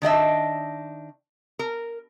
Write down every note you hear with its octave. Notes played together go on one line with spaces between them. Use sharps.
D#3 D4 D#5 E5
A#4